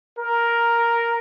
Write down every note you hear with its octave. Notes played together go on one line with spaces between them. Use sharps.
A#4